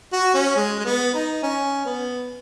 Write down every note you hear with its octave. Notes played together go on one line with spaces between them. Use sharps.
F#4
C#4
G#3
G#3
B3
D#4
C#4
B3